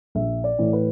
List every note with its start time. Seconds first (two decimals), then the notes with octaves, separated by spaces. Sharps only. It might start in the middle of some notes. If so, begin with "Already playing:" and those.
0.15 A#1 E5
0.44 D5
0.59 A2 E3
0.73 B4